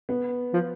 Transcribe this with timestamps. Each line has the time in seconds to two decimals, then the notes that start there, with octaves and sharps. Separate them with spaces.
0.09 B3
0.54 F3